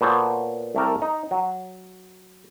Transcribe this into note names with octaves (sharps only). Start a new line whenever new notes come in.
A#2 B3 F#4 A4 C5 C#5
C2 A3 G4 A#4 A5
D#4
F#3